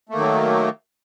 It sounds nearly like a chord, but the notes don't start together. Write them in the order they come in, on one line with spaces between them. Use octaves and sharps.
A3 A#3 D#3 F#3